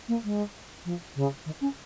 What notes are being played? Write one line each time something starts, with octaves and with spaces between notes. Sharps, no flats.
A#3
G#3
F3
C#3
D#3
C#4